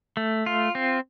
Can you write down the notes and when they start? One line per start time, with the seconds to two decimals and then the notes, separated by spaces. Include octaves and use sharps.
0.17 A3
0.46 F4
0.75 C4